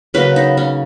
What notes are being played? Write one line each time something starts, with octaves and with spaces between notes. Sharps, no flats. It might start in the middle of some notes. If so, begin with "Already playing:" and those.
C#3 F#3 A#3 B4
D#4
C#4